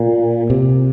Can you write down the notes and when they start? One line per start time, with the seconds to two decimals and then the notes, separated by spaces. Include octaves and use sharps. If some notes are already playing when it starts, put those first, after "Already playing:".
Already playing: A#2
0.50 C3